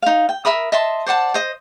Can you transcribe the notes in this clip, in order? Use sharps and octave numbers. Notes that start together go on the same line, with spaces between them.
D#4 F5
G5
A#4 E5 B5 D#6
D#5 E5 A5 C6
C5 D5 F#5 A5
C5 D#5